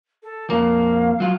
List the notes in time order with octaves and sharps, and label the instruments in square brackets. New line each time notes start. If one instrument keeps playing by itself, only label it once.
[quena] A4
[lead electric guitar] F2 A#3 [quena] F5
[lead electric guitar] F#3 F4